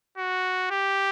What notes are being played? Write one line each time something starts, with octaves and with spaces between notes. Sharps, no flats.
F#4
G4